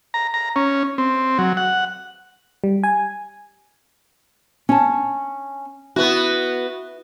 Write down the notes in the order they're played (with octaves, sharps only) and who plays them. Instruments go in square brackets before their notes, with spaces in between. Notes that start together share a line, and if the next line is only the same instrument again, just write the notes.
[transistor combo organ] A#5
A#5
C#4
C4
F#3
F#5
[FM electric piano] G3
G#5
[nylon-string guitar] C#4 A5
[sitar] B3 F#4 [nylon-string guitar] E4